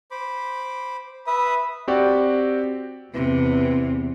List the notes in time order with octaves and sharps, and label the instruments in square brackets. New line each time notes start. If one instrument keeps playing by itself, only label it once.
[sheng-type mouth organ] C5 B5 D6
[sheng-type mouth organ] B4 E5 D#6 [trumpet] B5
[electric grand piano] C4 F#4 G4 D5
[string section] E2 [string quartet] C3 [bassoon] E3